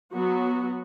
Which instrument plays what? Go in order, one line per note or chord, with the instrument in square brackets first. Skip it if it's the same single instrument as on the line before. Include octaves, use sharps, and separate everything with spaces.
[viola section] F#3 B3 F#4